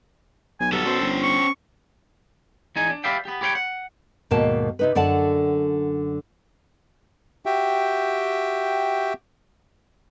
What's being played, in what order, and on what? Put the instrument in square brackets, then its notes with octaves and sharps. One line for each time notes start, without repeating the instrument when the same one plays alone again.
[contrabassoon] B1 [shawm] G#5
[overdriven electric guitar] G3 B3 [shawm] A4
[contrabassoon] B2 [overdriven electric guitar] C#4 C5
[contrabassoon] G1
[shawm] C#6
[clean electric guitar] E2 D#4 G#5
D4
G4 B4 D5 E5 F5 G5
B3 G4
G4 B4 C#5 F5 G5
F#5
[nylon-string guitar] D#2 G#2 B2 A#3 A5
C3 D#4 B4
F#2 D3 D5 F#5 A5
[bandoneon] F#4 G4 E5 G5